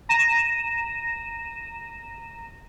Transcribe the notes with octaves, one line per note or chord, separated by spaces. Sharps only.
A#5 A#6 D#7 E7